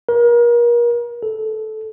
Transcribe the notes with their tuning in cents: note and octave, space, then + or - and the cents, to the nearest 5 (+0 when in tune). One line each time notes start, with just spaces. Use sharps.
A#4 +35
A4 -15